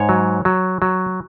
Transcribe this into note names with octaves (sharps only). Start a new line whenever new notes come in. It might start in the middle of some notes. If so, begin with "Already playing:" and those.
Already playing: G#2 C#5
F#3
F#3
F#3